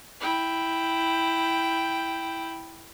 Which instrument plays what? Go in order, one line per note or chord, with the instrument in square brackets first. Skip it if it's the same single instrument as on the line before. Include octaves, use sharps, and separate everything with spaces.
[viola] E4 G5